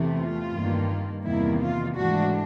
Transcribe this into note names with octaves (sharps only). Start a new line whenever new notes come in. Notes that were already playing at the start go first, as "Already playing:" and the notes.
Already playing: E2 C3 E3 A3
F4
G2 D#3 G3 A#3
E2 C3 D#3 G3 A#3 E4
F4
G#2 E3 A3 D4 F#4